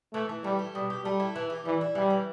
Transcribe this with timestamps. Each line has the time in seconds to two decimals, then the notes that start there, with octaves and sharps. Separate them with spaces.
0.14 E3 A3
0.29 E3
0.44 G3 A3
0.59 G4
0.75 B2 G3
0.90 G4
1.05 G3 A3
1.20 E4
1.36 E3
1.50 G4
1.65 E3 G3
1.81 E4
1.95 E3 G3
2.10 E3